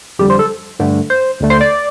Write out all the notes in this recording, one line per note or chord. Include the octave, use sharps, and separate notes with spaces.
F2 D3 G3 G4
C5
A4
G2 D3 A3
C5
D2 D3 A3
C5
D5